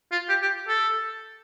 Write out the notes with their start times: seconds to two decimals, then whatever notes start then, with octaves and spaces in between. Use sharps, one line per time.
0.11 F4
0.29 G4
0.42 G4
0.68 A4